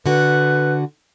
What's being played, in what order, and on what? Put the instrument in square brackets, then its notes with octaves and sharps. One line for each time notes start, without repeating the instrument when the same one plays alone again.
[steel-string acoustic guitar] D3 F#4 [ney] B4